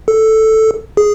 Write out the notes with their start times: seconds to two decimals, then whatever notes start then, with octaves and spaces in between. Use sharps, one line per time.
0.08 A4
0.97 G#4